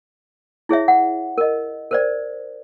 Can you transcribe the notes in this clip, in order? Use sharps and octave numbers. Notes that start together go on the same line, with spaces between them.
E4 G#4 C#5 E5
F#5
A#4 D#5
A#4 C5 D5